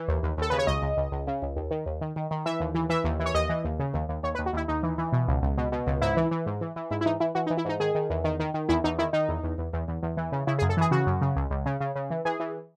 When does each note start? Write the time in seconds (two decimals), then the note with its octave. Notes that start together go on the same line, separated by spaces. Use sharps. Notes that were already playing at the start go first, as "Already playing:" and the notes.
Already playing: E3
0.08 D#2
0.23 D#2
0.38 D#2 A4
0.50 C#3 B4
0.59 C#5
0.67 C#2 D#5
0.82 C#2
0.97 C#2
1.12 C#2
1.27 C#3
1.42 C#2
1.56 D#2
1.71 D#3
1.86 D#2
2.01 D#3
2.16 D#3
2.31 D#3
2.46 E3 E5
2.60 D#2
2.75 E3
2.89 E3 E5
3.04 D#2
3.20 E3
3.26 C#5
3.34 D#2 D#5
3.49 E3
3.64 D#2
3.79 C#3
3.94 D#2
4.09 D#2
4.23 D#2 C#5
4.35 B4
4.39 D#2
4.46 F#4
4.53 D#2 E4
4.68 D#2 D#4
4.83 E3
4.98 E3
5.13 B2
5.28 C#2
5.42 C#2
5.58 B2
5.72 B2
5.87 C#2
6.01 G#2 E4
6.17 E3
6.31 E3
6.46 G#2
6.61 E3
6.76 E3
6.91 G#2 E4
7.01 E4
7.06 E3 D#4
7.20 E3 E4
7.35 E3 F#4
7.47 D#4
7.50 E3
7.58 E4
7.65 G#2 D#4
7.80 D#3 G#4
7.95 D#3
8.10 E2
8.24 D#3
8.40 D#3
8.54 D#3
8.69 E2 E4
8.84 E2 D#4
8.99 D#3 E4
9.13 D#3 D#4
9.29 E2
9.44 E2
9.58 E2
9.73 E2
9.88 E2
10.03 E2
10.17 E3
10.32 C#3
10.47 C#3 E4
10.59 G#4
10.62 F#2
10.69 A4
10.77 E3 G#4
10.91 C#3 F#4
11.07 F#2
11.21 C#3
11.36 C#2
11.50 C#2
11.66 C#3
11.81 C#3
11.95 C#3
12.10 E3
12.25 E3 G#4
12.40 E3